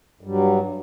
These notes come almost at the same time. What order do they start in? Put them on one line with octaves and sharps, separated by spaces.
G2 G3 F#3